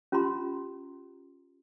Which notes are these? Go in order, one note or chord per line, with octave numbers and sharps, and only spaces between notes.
C#4 F4 G4 A#5 C6